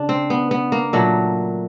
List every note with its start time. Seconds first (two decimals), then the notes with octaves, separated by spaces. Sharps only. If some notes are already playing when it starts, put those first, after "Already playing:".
Already playing: C#3 D4
0.09 C4
0.30 B3
0.51 B3
0.72 A#3
0.93 A#2 F#3 A3